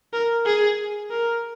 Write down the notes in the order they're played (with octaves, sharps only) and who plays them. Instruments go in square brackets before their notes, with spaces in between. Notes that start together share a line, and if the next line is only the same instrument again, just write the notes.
[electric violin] A#4
G#4
A#4